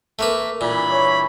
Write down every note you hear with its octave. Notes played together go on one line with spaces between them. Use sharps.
A3 A#3 B4
G2 A#2 E3 B5
C#5